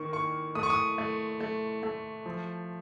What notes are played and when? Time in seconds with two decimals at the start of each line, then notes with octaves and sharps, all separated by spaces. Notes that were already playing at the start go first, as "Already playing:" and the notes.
Already playing: D#3 A#3 C#6
0.13 A#3 C#6
0.55 A3 D#6
0.63 C#6
0.70 D#6
0.98 A3
1.40 A3
1.83 A3
2.26 F3